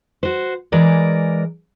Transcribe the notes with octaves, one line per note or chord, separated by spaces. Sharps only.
F#4 C5
E3 G#3 A#4 D5